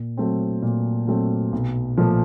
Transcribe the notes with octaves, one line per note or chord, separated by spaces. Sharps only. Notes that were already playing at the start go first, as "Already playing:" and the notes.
Already playing: A#2
F#3 A3 C4
A#2
F#3 A3 C4
B1
A#2 F3 A3